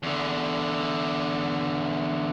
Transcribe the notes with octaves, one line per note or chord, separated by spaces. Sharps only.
E2 D3